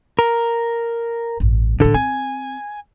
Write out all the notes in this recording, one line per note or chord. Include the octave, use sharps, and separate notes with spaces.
A#4
A1 G2
A2 D3 G3 A4
C4 G#5